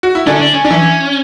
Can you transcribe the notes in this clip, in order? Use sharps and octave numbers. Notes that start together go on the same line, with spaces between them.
F#4
E4
D3 C#4 D4
D4
C#4
D4
E3 E4